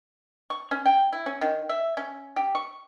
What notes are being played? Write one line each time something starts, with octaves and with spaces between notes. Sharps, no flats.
C#6
C#4
G5
E4
C#4
D#3
E5
C#4
G4
C#6